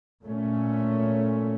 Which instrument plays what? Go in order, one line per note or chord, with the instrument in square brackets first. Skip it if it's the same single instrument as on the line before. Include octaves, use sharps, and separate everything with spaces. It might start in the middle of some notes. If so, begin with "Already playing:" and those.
[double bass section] A#2 A3 C#4